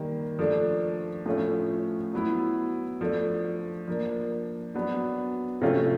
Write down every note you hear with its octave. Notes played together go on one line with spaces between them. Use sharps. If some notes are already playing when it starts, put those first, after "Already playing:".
Already playing: D#3 G3 A#3
F3 A3 D4
A2 F3 A3 C#4 F4
F#3 B3 E4
F3 A3 D4
F3 A#3 D4
F#3 B3 D4
C3 F3 A3 C#4 F4